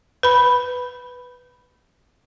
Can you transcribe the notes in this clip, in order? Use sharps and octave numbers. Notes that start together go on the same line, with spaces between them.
B4 B5